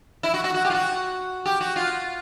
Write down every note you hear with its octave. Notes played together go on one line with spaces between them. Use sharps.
E4
F#4
F#4
F#4
G4
F4
F#4
G4
F#4
F4